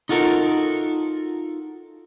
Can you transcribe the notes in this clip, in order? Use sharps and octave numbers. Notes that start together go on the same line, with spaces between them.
D#4 F4 F#4 A4 A#4